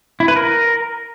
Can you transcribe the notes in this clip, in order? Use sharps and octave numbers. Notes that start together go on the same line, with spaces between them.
E4
B4
A#4